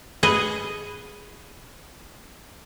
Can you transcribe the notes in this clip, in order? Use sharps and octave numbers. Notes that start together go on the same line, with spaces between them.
G#4 B4 D#5